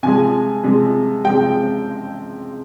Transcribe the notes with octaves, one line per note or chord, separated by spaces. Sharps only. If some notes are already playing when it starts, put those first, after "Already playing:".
C3 F3 G#3 G#5
C3 F3 G#3
C3 F3 G#3 G5